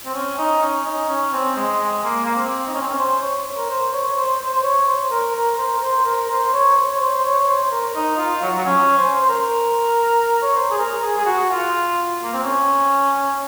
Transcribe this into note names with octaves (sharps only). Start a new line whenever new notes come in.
C4
C#4
D#4
C#4
D#4
C#4
C4
G#3
G#3
A#3
A#3
C4
D#4
C#4
C4
C#4
C5
C#5
A#4
C5
C#5
C#5
C5
C5
C5
C#5
C5
A#4
A#4
C5
A#4
C5
A#4
C5
C#5
C5
C#5
C5
C5
C#5
C#5
C5
A#4
D#4
F4
F#3
F#3
C#4
C5
C5
A#4
C#5
C5
G#4
A#4
G#4
G#4
F#4
F4
A#3
C4
C#4